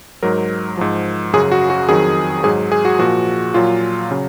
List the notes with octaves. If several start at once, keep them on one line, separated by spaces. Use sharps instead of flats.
G#2 F#3 A#4
G#2 F3
F#2 C#3 F#3 G#4
F#4
F#4
F2 D#3 F#3 G#4
G#2 F#3 G#4
G#4
F#4
A#2 F3 F#4
A#2 F#3 F4
C#3 F#3